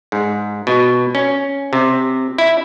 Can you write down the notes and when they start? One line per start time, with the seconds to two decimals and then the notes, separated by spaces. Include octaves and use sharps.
0.12 G#2
0.67 B2
1.15 C#4
1.73 C3
2.38 E4